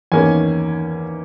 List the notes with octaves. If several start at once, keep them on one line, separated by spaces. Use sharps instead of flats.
E2 D#3 A#3 C#4 G#5